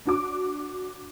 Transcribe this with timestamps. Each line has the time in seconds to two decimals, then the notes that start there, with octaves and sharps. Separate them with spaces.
0.06 D4 F#4 D6